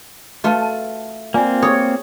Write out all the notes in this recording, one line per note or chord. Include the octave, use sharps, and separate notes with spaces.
A3 F4 F#4 B4 A5
A5
A#3 C4 F4 D5 G#5
G4 G#4 C#5 D#6